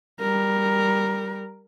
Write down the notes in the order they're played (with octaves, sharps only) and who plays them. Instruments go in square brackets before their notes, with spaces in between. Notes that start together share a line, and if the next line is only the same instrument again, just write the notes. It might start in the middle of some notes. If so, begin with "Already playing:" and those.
[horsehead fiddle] G3 A#4